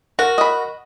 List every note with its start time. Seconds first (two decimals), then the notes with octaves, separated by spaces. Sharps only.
0.19 F#4 A#4
0.38 D#5 B5